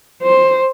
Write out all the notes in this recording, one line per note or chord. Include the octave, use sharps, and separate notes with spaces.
C5